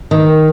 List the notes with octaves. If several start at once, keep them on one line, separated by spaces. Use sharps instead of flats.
D#3